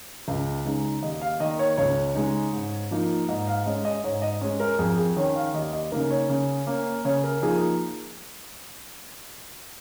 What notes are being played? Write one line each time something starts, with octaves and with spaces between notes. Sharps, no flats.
C#2
C#3 G#3 D#4
D#2 D#5
F5
D#3 A#3 D#5
C#5
C#2 C#5
C#3 G#3 D#4
G#2
F3 A#3 D#4
G#2 D#5
F5
G#3 C#4 D#5
D#5
G#2 C#5
D#5
G#3 C#4 C#5
A#4
F2 G#4
G#4
D#3 C#4 C#5
F5
D#2 D#5
D#5
C#3 A#3 D#4 A#4
C#5
C#3
A#3 C#4
C#3 C#5
A#4
F3 A#3 D#4 G#4